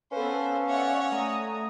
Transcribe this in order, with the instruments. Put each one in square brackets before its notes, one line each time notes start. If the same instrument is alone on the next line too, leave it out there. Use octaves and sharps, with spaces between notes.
[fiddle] B3 C5 [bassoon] C#4 [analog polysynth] A4 B4 [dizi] F5
[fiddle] C#5 F#5 [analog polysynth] D5 E5 C#6
[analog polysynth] A3 A#5 D#6